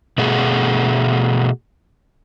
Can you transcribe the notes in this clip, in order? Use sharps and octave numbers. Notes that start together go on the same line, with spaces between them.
B2 A3 F#4 G#4